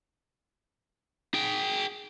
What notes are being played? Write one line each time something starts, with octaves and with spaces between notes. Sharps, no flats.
G#4 G5